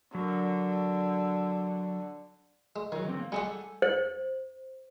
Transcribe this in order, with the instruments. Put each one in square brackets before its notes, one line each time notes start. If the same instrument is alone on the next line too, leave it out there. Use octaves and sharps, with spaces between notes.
[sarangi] D3 [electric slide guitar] F#3 A#4
[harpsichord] G#3
[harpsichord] D#3 [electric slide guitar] F#3 G#4
[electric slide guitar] D3 E3 C4
A#3
[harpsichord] G3 G#3 G4 [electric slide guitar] A4 F#5 G#5
[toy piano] C5